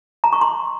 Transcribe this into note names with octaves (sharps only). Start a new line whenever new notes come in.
A#5
C#6
C6